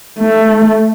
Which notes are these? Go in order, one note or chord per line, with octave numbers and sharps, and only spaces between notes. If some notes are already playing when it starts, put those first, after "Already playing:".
A3